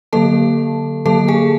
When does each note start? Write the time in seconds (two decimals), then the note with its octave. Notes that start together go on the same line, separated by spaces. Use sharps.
0.13 D3 F#3 A#3 A4 A5
1.06 D3 F#3 A#3 A4 A5
1.28 G#4 G#5